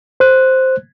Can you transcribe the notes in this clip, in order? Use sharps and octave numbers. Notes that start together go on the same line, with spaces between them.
C5 F#6